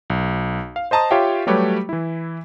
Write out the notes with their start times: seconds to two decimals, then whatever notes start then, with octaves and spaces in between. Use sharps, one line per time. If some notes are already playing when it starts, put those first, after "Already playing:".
0.10 B1
0.76 F5
0.91 C5 D#5 A5 A#5 D#6
1.11 F4 G4 C#5 E5 F5 G5
1.47 F#3 G3 A3 G4 B4 C#5
1.89 E3 E4